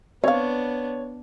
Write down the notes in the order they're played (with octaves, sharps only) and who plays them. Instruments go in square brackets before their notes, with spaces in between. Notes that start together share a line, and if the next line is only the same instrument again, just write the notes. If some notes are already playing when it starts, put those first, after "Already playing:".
[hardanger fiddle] B3 D4 [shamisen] C4 F5 [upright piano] C#5